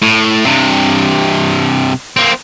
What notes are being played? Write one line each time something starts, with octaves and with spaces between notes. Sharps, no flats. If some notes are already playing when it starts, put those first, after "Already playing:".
A2
G2 C3
A#3 C4